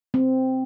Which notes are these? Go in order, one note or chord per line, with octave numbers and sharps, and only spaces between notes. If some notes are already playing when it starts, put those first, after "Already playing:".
C4